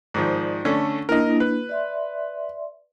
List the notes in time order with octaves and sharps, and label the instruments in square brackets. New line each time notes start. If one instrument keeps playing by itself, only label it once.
[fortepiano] G#2 D#3 F3 [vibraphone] D5
[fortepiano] D3 A3 C#4
[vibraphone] A#3 D4 E4 [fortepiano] A#4 D#5
[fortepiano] B4
[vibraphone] D5 E5 C6